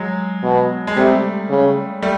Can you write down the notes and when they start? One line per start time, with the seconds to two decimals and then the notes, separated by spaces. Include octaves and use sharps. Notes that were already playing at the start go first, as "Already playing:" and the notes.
Already playing: F#3 G#3
0.43 B2
0.87 G#3
0.96 C3 G3 A3
1.50 C#3
2.02 G3 A3